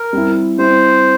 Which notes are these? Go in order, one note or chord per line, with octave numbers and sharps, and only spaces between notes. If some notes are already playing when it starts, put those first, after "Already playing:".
Already playing: A#4
G3 C4 E4
G3 C4 E4 C5